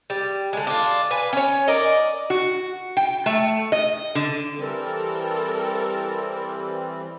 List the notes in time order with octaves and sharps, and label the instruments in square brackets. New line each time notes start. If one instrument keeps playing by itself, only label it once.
[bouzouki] G3
D3 G#3
D4 F4
B4 G#5
C#4 C#5
A#4 D5 D#5
[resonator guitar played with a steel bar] F#4
G5
A3
D#5
D3
[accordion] E3 G3 C4 [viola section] A4 A#4